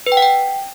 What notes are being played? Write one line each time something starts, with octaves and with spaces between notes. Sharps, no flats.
B4
G5
F#5
G5